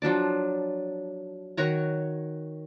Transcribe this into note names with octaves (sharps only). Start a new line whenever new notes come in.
F3 F#3 D4 D5
D#3 F#4 C#5 A#5